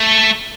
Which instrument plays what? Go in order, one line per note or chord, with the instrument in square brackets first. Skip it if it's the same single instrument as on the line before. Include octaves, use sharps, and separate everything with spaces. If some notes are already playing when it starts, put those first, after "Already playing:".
Already playing: [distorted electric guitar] A3